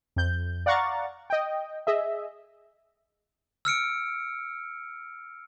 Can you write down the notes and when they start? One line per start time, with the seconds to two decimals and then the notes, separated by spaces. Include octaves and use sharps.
0.16 F2 G6
0.66 D5 F5 F#5 A#5 C#6 A6
1.30 D#5 G5
1.87 G#4 D#5 E5
3.65 E6 F6 C#7 D7